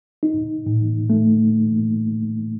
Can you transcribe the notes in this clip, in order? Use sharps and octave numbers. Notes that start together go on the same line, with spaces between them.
D#4
A2
A3